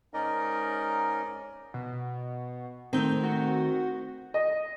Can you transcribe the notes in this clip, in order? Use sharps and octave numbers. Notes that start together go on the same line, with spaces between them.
G#2 C#4 D#4 A#4 D5 D#5
B2
D#3 A3 C4 G6
F#4
D#5